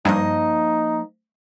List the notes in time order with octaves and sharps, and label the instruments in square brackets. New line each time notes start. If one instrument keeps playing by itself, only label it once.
[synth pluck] G2 [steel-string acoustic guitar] F3 A#3 D#5 [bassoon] D#4